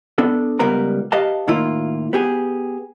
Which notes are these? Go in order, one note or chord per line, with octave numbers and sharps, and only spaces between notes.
B3 D4 A4
C#2 G3 B3 A#4 B4 A#5
G4 B4 D#5 F5 A5
A2 D#3 A#3 E4 F4
B3 G4 G#4